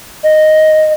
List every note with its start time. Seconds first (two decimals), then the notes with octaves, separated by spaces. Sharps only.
0.24 D#5